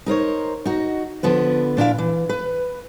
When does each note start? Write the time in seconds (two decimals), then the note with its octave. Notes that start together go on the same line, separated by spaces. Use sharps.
0.06 D#4 A#4 C5 C#5
0.65 D#4 F#4
1.23 D3 F3 B3 B4
1.77 A#2 D4 E4 F5
1.98 E3
2.29 B4